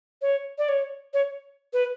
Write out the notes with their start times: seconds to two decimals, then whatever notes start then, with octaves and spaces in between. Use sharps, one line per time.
0.22 C#5
0.58 D5
0.69 C#5
1.14 C#5
1.73 B4